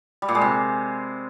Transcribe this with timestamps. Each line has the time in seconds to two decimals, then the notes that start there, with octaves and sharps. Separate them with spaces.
0.22 G3
0.29 A#2
0.35 G#3
0.41 C3